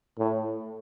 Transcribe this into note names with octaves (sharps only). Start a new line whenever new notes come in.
A2